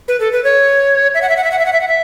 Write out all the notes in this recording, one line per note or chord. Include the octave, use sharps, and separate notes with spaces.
B4
A4
B4
C#5
E5
F#5
E5
F#5
E5
F#5
E5
F#5
E5
F#5
E5